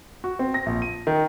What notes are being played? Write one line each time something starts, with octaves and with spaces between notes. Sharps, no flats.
F#4
C4
A#6
A#1
D#7
D#3